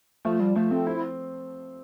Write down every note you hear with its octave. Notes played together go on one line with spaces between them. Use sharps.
F3 A3
G3
F3 A3
A3 C4
C4 E4